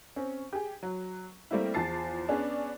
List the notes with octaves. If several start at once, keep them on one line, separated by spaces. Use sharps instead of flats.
C4 C#4
G4 G#4
F#3
G3 A3 A#3 C4 E4
E2 F3 A5 A6 C7
B3 C#4 D4 G#4